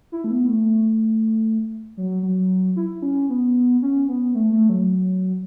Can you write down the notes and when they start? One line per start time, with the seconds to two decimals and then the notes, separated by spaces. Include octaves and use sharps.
0.12 E4
0.24 A3
0.31 B3
0.47 A3
1.97 F#3
2.23 F#3
2.76 E4
3.02 C#4
3.29 B3
3.82 C#4
4.08 B3
4.34 A3
4.52 A3
4.69 F#3